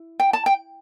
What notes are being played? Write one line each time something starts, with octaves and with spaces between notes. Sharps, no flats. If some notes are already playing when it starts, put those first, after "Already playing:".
Already playing: E4
G5
A5
G5